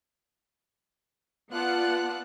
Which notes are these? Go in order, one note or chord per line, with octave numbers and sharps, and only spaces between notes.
B3 F4 D5 F#5 A5 F#6